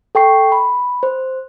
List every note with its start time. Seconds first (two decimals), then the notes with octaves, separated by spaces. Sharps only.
0.15 A4 G5 C#6 C7
0.52 B5
1.03 C5